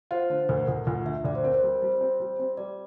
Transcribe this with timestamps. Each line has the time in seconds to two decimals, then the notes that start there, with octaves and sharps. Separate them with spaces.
0.11 F4 C5
0.30 D3 C5
0.49 D2 A#4
0.67 D2 A4
0.87 D2 F4
1.06 D3 E5
1.24 D2 D5
1.35 C5
1.44 C4 A#4
1.54 C5
1.63 G3
1.82 G3
2.01 C4
2.20 G3
2.39 C4
2.57 G3 D5